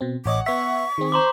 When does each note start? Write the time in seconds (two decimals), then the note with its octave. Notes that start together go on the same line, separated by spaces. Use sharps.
0.01 B2 C4
0.26 A1 C#5 D#5 F#5 D6
0.46 B3 E5 C#6 B6
0.98 D#3 C4 G#4
1.12 C5 A#5 C6 D6